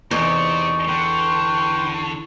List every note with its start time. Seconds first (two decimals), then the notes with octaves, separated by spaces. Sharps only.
0.11 E2 C3 D#4 G4 D5 C#6
0.88 D3 B4 G5 C6